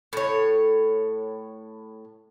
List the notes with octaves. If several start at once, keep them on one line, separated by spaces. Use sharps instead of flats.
A2 C#5